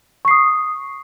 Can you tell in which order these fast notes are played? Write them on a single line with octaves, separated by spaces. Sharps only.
C#6 C7 D#6